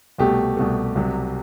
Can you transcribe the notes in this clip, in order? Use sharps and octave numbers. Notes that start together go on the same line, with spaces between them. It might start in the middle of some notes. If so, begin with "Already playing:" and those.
C2 B2 A3 G4
C2 B2 A3
C2 C3 F#3